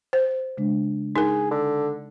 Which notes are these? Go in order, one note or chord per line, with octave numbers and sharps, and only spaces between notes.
C5
C#3 G#3 D4
D#4 G#4 A#4
D3